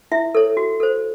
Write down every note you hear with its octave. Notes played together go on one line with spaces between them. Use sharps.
E4 E5
A4 C#5
F#4
A4 C5